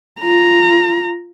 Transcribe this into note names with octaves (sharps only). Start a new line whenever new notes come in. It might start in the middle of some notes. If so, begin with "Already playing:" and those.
F4 A#5